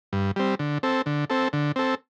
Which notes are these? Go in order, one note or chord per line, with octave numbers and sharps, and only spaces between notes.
G2
G3 C4
D3
C4 A4
D3
C4 A4
D3
C4 A4